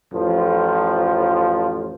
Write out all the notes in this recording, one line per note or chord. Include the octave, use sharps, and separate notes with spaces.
A1 F2 F3